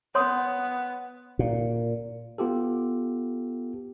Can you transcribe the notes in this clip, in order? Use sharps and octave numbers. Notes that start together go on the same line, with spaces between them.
B3 C#5 C6 D#6
A#2
B3 F4 G4 A4